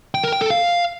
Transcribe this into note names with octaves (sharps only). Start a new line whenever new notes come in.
G5
A#4
G5
A4
F5